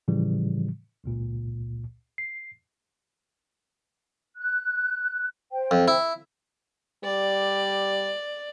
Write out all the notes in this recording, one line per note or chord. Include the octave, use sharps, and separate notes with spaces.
A2 C#3 E3 F3 G3
G#1 C#2 A#2
C7
F#6
C5 G5
F2
E4
G3 D5